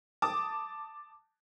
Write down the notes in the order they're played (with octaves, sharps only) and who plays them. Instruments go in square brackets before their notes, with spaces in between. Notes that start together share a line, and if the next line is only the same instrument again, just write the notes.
[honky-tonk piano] A5 D6 D#6